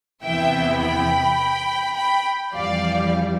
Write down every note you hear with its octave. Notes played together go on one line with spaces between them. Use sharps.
E2 C3 E3 B3 E4 E5 G5
G5 B5
G5 B5
F2 E3 G3 D5 F5